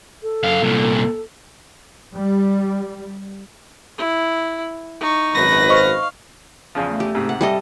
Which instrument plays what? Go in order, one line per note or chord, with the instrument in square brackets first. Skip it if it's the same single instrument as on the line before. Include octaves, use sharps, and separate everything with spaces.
[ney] A4
[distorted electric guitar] F#2 F5
C2 A#2
[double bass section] G3
[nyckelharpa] E4
D#4 C#6
[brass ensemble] G#1 F#2 B4 [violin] A#6
[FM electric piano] C5 D#5 C#6 [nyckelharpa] F5
[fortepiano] E2 C#3 F3
[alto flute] A3
[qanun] G4
[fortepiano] G#2 C3
[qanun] F#5
[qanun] G3 A4 D#5 [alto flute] E5